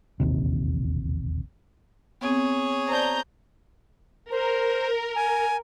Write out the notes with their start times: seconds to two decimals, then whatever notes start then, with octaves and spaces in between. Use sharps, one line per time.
0.20 E1 A#1 D#2 C3
2.21 B3 C4 G#4 C#5
2.88 C5 D5 A5 A#5 G6
4.31 A#4 C5
5.16 G#5